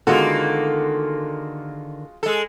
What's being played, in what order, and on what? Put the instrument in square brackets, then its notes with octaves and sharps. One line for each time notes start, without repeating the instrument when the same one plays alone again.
[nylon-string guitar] D3 D#3 B3 [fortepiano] G#3 F4 F#4 [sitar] A#3 A4
[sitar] G#3 A4